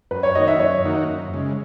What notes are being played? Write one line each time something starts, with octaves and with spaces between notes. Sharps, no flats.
F#2 B4
C#5
D#3 A#3 D#4 F#4 D#5
E5
F#2 C#5
D#3 A#3 D#4 F#4
F#2
C#3 G#3